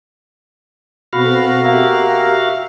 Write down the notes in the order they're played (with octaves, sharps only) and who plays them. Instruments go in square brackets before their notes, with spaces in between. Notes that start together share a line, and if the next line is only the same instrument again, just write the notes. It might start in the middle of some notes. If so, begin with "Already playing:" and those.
[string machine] B2 C4 A4 [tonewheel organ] F#4 F5 [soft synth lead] B5
[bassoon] A#3 [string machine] G4 [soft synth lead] E5